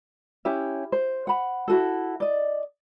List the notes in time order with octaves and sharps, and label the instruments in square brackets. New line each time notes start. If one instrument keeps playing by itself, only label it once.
[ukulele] C#4 E4 G4 E5
C5
F#5 B5
E4 F#4 A4
D5 D#5